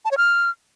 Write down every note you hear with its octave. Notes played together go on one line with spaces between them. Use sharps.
A5
C#5
F6